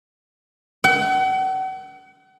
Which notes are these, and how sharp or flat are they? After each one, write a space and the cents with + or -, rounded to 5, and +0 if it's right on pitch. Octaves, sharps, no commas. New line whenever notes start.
F#5 +40